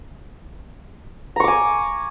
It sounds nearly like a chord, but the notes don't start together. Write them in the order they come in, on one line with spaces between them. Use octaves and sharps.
A#5 C#6 D6 G#5